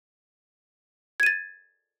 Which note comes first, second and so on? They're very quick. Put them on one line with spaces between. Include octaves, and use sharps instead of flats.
G#6 D#7 A6